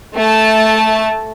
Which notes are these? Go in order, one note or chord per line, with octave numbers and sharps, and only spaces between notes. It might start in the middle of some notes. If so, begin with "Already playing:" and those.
A3 A5